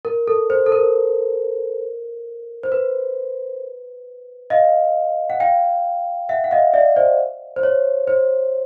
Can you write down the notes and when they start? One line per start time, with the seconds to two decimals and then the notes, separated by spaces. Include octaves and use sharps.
0.05 A#4
0.28 A4
0.50 C5
0.66 A4
0.72 A#4
2.63 C5
2.72 B4
4.50 D#5 F5
5.30 F#5
5.40 F5 G5
6.29 E5 F#5
6.44 F#5
6.51 D#5 F5
6.74 D5 E5
6.96 C5 D5
7.56 C5
7.63 C#5
8.07 C5